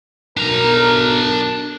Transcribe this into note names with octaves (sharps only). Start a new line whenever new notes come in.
B1 D4 A#4 A#5